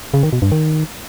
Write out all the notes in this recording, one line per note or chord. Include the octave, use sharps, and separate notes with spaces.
C#3
D#3
B2
G2
D#3